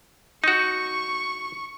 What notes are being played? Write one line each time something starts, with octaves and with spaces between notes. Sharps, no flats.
D#4 F#4 C#6